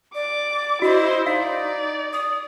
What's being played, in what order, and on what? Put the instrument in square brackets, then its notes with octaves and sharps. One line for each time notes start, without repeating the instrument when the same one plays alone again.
[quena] D5 [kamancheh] D6
[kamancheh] E4 C5 [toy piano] F#4 [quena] D#5
[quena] D#4 [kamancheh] D5 [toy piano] F5
[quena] D#6